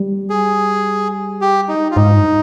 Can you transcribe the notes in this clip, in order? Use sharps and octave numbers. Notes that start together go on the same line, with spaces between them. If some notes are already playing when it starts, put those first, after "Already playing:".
Already playing: G3
G#4
G4
D#4
F4
G#2 D#4
G2